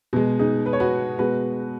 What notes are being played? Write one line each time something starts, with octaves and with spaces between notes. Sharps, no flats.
B2 G#3
D#4 G#4
B4
C#5
F#4 B4
B2 G#3 F#4 B4